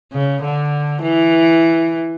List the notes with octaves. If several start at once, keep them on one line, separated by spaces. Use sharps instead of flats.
C#3
D3
E3